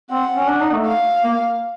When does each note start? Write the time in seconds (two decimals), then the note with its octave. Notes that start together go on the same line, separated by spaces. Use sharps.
0.11 C4 F#5
0.36 C#4
0.48 D4
0.61 D#4
0.73 A3
0.86 F5
1.24 A#3